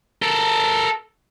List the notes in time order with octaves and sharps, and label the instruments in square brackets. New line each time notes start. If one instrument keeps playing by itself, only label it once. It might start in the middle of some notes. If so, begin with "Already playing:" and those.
[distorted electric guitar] A4 A#4